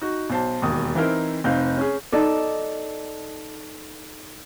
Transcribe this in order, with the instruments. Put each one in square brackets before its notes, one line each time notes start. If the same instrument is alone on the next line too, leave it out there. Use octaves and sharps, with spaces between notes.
[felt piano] D#4 F#4
B1 C5 A5
E1 D#2 D#6
E3 C4 D#4 E4 A#4 C5
F1 C4 D#4 F5 G6
C#4 G#4
[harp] D#4 A4 D5